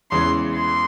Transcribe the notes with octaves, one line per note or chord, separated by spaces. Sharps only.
E2 C#3 E3 G#3 C6
C6